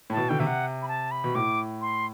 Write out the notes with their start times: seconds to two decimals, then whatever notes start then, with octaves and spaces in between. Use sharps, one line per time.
0.10 A2 A5
0.17 B2
0.29 D3 G5
0.40 C3 E5
0.47 F#5
0.82 B5
0.88 A5
1.11 B5
1.24 B2
1.35 A2 D6
1.81 C6